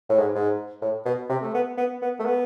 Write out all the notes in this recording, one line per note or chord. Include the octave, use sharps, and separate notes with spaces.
A2
G#2
G#2
A2
B2
C3
A3
B3
B3
B3
A3
B3